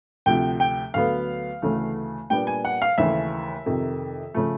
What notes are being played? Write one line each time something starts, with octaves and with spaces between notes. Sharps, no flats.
D2 C3 F3 G5
G5
D2 D3 F#3 B3 F5
D2 C#3 E3 A3
A#2 G3 B3 D4 G5
G#5
F#5
F5
D#2 C#3 E3 A3 E5
F2 C3 D#3
C#3 F3 A3